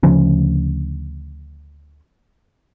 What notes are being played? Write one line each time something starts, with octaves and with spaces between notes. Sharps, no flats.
D2 C#3 F3 C#4